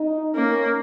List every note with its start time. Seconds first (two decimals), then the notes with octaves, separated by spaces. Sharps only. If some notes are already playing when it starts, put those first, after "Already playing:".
Already playing: D#4
0.34 A#3 C#4